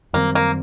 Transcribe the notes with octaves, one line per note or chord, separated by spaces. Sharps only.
F#2 D#3 G3 A#3 C4
A#3